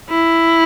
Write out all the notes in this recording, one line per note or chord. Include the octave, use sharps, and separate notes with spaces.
E4